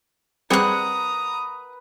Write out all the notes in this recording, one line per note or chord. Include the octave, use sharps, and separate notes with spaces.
G3 C4 G#4 B4 F#5 A#5 D#6 F#6